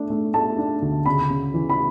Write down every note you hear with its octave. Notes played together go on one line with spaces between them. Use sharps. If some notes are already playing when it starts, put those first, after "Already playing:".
Already playing: A3 D4
A3
A3 A5
D4
D2
C#3 B5
C#3
E3
B5